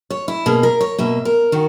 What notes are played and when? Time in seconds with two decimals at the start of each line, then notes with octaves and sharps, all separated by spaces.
0.10 C#5
0.28 E4
0.46 B2 A#3 G#4
0.63 A#4
0.81 C#5
0.98 B2 A#3 E5
1.25 A#4
1.52 D#3 F#4